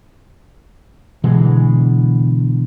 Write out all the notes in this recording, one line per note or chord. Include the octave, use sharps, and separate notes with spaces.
B2 D3 E3 G#3